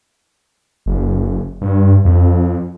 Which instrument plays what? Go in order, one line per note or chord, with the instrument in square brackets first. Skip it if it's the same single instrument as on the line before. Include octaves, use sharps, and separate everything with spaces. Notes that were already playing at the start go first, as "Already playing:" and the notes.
[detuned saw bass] F#1
G2
F2